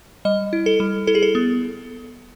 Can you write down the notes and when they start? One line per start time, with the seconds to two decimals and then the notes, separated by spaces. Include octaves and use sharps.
0.25 G3 D#5
0.53 E4
0.66 A4
0.80 G3
1.07 E4 A4
1.15 G#4
1.22 A4
1.35 B3